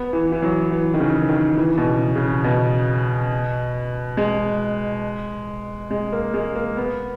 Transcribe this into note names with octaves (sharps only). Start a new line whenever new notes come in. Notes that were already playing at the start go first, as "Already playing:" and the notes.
Already playing: B3
E3
E3
F#3
E3
D#3
C#3
D#3
E3
B2
C#3
C#3
B2
G#3
G#3
A#3
G#3
A#3
B3